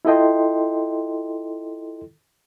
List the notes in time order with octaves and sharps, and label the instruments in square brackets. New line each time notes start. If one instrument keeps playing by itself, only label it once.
[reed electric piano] E4 F4 A4 D#5 G5 C6